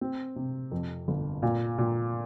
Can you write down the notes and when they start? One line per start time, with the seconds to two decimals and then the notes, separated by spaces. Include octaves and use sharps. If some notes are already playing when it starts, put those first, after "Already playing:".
0.01 C4
0.36 C3
0.71 F2
1.08 G1
1.42 A#2
1.78 A#2